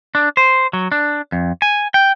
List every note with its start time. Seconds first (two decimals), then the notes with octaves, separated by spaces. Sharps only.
0.15 D4
0.37 C5
0.73 F#3
0.92 D4
1.32 F2
1.62 G#5
1.94 G5